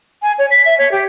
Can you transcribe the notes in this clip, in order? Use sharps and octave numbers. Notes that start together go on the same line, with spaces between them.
G#5
C#5
B6
E5
C#5
G4